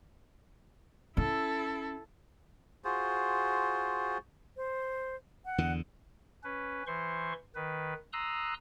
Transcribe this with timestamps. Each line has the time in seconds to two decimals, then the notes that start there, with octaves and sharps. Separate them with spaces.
1.17 C#4 E4 A4
2.85 F4 F#4 G#4 C5
4.57 C5
5.45 F#5
5.58 E2 D3
6.44 C#4 B4
6.87 E3 C5 C6 C#6
7.55 D#3 B4
8.13 A#5 C6 D#6 E6 F#6